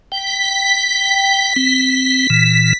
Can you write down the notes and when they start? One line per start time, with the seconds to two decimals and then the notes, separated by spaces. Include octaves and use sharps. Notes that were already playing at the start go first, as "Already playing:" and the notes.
0.12 G5 B6
1.56 C4
2.30 A#2 E3